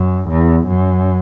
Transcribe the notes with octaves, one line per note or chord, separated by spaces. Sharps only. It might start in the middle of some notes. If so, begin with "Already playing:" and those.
Already playing: F#2
E2
F#2